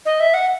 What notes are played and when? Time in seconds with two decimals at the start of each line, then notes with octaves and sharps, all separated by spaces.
0.06 D#5
0.20 E5
0.34 F#5